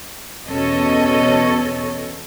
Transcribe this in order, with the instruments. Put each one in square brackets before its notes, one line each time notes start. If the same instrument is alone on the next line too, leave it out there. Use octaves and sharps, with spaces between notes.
[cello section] E2 B2 C#4 A4 C#5 D#5